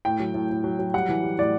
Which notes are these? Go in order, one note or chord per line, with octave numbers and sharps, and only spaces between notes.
A2 G5
F#3
A2
A2
F#3
F#3
G3 F#5
E3
G3
A2 D5